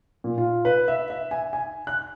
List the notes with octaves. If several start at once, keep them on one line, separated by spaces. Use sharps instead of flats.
A#2
F4
B4
E5
E5
G#5
G#5
F#6